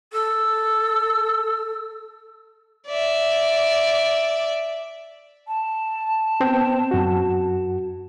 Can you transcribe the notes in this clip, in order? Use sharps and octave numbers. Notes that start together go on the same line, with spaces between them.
A4 E6
D5 E5
A5
B3 C4 G5
F#2 F#4